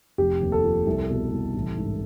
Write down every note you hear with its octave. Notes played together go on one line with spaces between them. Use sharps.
F1 G4
D#2
A4
F3
C2
B2
C2
A1
G#2